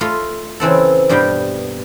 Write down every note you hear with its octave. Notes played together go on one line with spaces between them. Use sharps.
A3 F4 D#5 F5
C#3 E3 C4 A4
G2 B2 G3 F5 G5